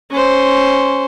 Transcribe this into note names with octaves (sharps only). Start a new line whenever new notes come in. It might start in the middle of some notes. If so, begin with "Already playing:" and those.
C#4 C5